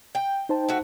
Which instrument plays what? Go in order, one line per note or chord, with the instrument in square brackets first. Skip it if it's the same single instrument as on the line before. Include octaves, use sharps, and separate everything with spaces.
[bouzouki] G5
[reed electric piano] D#4 C5 A5
[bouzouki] A3 F#4